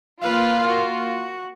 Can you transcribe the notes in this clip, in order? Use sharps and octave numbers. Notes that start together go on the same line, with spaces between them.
A#3 F4 B4 F5
F#4